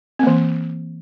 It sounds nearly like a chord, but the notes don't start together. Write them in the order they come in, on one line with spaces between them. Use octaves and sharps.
C4 A#3 E3